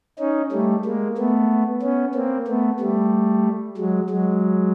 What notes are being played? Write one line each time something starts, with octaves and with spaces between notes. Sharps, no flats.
C#4 D#4
G3 A3
G#3 A#3
A3 B3
B3 C#4
A#3 C4
A3 B3
G3 A3
F#3 G#3
F#3 G#3